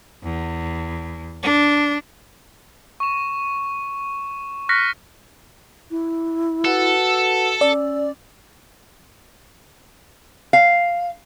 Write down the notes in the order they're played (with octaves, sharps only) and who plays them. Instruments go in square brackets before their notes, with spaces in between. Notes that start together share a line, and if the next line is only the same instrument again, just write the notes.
[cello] E2
D4
[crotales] C#6 E7
C#6 F6 F#6 A#6 B6 C#7
[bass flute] E4
[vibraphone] F#4 B4 F#5 [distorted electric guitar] A4
[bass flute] C#4 [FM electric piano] D5 [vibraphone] E6
[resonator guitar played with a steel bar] F5